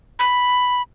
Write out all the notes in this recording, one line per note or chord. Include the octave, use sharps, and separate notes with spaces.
B5